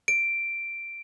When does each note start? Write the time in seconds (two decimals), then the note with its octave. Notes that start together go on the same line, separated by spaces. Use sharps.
0.08 D7